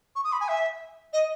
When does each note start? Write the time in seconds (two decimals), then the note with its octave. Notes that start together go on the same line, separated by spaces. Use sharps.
0.15 C#6
0.24 D#6
0.32 B5
0.40 G#5
0.48 E5
1.13 D#5